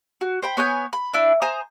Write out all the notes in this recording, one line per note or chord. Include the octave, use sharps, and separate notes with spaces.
F#4
C5 G5 B5
B3 C#5 G#5 G6
B5
D4 E4
C5 G#5 A#5 D#6